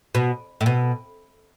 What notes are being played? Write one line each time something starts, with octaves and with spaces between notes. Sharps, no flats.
B2
A2
B2